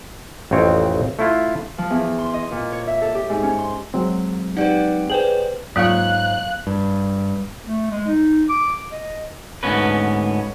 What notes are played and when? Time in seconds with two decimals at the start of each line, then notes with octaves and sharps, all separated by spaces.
0.51 A1 F2 C4 C#5
1.19 A3 E4 F4
1.78 F3
1.90 E2
2.18 C6
2.34 D#5
2.52 A#2
2.72 C#5
2.87 E5
3.01 A4
3.15 G4
3.30 G#2
3.43 C#4
3.58 C6
3.94 F#3 G#3 C4
4.57 D#4 G4 B4 D5 F#5
5.10 G#4 B4 C5 G5 F#7
5.76 G#2 F#3 A#3 F4 C#5 F5 F#6
6.67 G2
7.65 A3
7.91 G#3
8.07 D#4
8.49 D6
8.92 D#5
9.63 D2 G#2 B3 C#4 B4